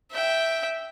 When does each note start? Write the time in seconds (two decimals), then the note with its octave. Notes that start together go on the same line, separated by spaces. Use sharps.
0.12 E5 G5